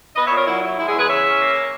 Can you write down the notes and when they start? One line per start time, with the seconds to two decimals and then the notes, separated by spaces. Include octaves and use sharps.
0.16 B3 B4 D#5
0.26 C#5 E5
0.31 A#2
0.36 A#4 C#5
0.47 F#3 E4
0.62 E4
0.78 G#3 E4
0.88 E4 G#4
0.93 E2
0.99 G#4 B4
1.09 C#3 C#5 E5
1.24 C#4
1.40 A#3